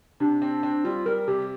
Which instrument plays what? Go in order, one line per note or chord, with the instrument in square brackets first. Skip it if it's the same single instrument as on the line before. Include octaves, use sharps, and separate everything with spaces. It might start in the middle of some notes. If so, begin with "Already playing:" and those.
[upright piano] C3 [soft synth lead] D4
[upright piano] C4
C4
[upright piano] G3 [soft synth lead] F4
[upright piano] G3 [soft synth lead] A#4
[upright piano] C3 [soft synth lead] G4